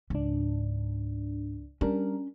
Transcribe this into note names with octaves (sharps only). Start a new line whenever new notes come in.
C#2 G#2 D4
G3 C#4 D4 A#4